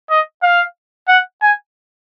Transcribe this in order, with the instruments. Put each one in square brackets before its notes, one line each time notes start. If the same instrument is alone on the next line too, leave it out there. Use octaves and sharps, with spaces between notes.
[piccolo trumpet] D#5
F5
F#5
G#5